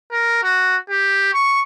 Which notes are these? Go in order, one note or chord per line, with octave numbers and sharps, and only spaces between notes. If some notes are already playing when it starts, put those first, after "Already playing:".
A#4
F#4
G4
C#6